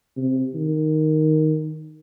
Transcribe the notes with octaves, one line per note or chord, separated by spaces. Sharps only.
C3
D#3